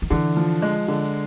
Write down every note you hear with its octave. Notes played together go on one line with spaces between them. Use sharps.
D#3
D3 E3
F3
G#3
D3